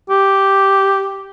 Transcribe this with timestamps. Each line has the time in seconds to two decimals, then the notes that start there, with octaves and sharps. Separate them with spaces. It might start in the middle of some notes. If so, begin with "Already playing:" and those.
0.09 G4